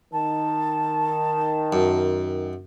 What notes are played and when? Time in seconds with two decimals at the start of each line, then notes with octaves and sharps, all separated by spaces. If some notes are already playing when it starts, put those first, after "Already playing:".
0.13 D#3 A5
1.73 F#2